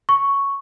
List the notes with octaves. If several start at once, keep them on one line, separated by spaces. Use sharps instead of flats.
C#6